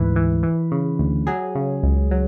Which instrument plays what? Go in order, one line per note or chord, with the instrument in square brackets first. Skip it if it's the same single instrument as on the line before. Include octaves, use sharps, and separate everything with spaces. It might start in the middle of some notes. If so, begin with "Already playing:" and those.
Already playing: [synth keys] D2 G#2 E3 B4
E3
E3
C#3
D2
F#3 G#4
C#3
C#2
F#3